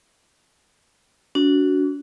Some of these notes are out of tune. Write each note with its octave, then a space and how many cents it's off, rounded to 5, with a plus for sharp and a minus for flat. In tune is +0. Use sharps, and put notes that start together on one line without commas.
D4 -40 F#4 +0